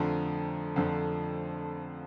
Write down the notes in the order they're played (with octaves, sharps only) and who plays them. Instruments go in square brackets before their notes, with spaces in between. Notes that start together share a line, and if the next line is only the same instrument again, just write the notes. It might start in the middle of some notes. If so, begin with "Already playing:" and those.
Already playing: [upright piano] F2 D3 F3 A3 A#5
F2 D3 F3 A3